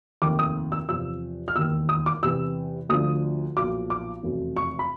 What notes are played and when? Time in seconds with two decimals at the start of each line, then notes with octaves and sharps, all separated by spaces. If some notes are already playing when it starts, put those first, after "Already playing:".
0.22 F1 D#2 D#3 D6
0.39 D#6
0.72 E6
0.89 E2 C3 F3 E6
1.48 F6
1.55 E1 D#2 D#3 E6
1.89 D#6
2.06 D6
2.23 E2 C3 E3 E6
2.89 D2 D3 F3 D#6
3.57 B1 A#2 F3 D6
3.90 D6
4.23 F1 E2 B2
4.57 C#6
4.79 B5